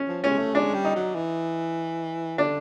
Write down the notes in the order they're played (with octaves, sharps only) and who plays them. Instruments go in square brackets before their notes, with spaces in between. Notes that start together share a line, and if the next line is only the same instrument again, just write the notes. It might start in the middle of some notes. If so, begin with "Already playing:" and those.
Already playing: [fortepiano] C#4
[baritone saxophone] F3
[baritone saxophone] G#3 [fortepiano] C#4
[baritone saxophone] A3
[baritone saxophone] G#3 [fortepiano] D4
[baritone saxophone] G3
[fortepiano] D#4
[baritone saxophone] F#3
E3
[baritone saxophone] D3 [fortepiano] D4